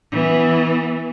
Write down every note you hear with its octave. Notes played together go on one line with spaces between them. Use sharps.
E3 B3